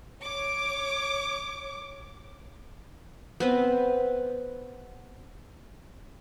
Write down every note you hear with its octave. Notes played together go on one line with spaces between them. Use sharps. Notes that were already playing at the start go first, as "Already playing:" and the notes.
C#5 D6
B3 C4 B4